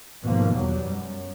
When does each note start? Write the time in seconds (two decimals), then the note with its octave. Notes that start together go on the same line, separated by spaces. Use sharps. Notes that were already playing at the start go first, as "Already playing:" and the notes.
0.22 G#2 B2 D#3 F3 A#3
0.52 E2 F#3 G3
0.83 F#2